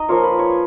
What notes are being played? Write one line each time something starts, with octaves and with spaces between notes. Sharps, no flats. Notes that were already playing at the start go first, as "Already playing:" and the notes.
Already playing: D#4 D#5 A#5
F3 A#3 F4 C#5
B4
C#5